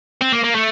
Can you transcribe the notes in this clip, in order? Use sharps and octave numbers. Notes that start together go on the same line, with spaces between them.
C4
A#3
A#3
A3